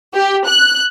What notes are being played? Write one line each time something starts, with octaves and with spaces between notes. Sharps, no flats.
G4
F#6